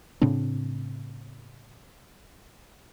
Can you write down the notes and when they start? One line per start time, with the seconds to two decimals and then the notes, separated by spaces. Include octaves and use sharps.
0.22 A2 C#3 C4 D4